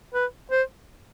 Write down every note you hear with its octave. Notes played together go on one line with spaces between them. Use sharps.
B4
C5